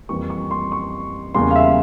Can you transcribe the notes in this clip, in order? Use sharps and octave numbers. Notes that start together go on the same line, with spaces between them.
F2 E3 G3 A#3 C#6
C#6
C6
C#6
E2 C#3 G3 A#3 C6
F5
E5